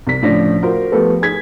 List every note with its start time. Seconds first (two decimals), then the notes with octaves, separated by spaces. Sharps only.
0.07 C2 B6
0.22 A2 C#3 F3 D4 A#6
0.62 F4 F#4 A#4 C5
0.92 F3 A3 B3 G4 A4 B4
1.22 G#4 G#6 B6